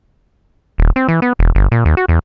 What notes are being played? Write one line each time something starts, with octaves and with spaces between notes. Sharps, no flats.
D#1
C4
E3
B3
E1
G1
A#2
D#2
F#4
E2